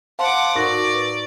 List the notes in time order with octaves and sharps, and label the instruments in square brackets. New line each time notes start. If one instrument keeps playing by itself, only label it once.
[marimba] C5 [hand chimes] F5 A5 C6 [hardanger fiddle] F#5 D6
[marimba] A2 D#4 F#4 [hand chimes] A#4 C#6 A#6 [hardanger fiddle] D5
[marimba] B4